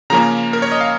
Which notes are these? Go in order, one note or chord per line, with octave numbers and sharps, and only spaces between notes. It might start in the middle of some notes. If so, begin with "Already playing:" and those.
C#3 F3 A#3 C#4 A#5
A#4
C#5
D#5
F5